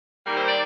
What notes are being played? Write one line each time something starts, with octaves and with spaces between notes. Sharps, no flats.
D#3 G3 A#3
C5
D5